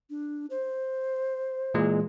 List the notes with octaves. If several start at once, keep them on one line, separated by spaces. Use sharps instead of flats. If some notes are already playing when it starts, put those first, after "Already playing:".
D4
C5
A#2 E3 G#3